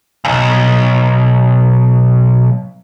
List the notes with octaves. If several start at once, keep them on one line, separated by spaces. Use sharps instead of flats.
B1 F2